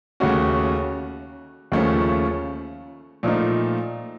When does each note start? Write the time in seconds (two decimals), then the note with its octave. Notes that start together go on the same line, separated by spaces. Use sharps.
0.20 D#2 C#3 A3 C#4 F#4
1.72 D#2 C#3 F3 A3 C#4
3.23 A#2 F3 A3 D#4